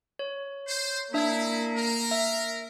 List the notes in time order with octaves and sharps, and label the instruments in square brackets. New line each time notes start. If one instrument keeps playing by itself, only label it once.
[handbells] C#5
[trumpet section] C5
[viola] A#3 [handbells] D4 E5 [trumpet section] E4
[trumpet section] A#4
[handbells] E5